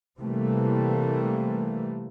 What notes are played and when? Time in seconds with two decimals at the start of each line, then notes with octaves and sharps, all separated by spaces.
0.19 C3 E3 G3 A3 A#3